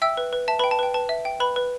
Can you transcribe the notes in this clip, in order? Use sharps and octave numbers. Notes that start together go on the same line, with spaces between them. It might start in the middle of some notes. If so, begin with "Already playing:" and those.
E5 G5 E6
B4
B4
E5 A5
B4 G5 B5
A5
B4 G5
B4 A5
E5
G5
B4 B5
B4